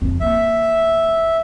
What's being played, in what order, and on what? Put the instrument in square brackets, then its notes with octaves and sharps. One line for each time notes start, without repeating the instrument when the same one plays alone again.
[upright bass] F2 D3
[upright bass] D#3 A#3 [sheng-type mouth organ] E5